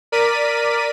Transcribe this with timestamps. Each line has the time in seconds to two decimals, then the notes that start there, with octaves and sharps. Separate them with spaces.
0.12 A#4 D5 B6 D#7